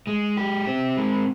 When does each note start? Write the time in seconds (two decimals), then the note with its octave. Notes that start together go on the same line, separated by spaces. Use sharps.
0.07 G#3
0.37 G4
0.67 C4
0.97 G#3